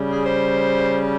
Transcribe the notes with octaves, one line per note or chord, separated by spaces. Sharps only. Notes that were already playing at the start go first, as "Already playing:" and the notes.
Already playing: C#3 G3
G#4
C5